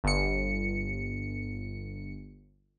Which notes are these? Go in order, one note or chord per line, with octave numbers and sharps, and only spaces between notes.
G1 C#7